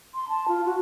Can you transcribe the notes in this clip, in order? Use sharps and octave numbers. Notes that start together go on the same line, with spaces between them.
C6
A5
F4
F#4